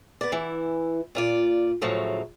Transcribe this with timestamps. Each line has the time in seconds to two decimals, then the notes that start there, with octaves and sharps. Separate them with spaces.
0.21 B3 D5
0.32 E3 E4
1.15 A#2 F4 D5
1.82 A2 C#3 F3 F#3 A3